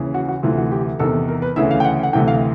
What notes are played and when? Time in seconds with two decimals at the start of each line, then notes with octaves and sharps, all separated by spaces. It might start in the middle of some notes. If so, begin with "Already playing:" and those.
Already playing: D#2 C#3 E3
0.14 F#4
0.29 F#4
0.43 D2 C3 E3 F4
0.57 F#4
0.72 G4
0.99 E2 C3 D#3 A4
1.28 A#4
1.42 B4
1.56 D2 C#3 E3 E5
1.71 F5
1.80 G5
1.84 F#5
2.03 F#5
2.13 D2 C3 E3 G5
2.28 F5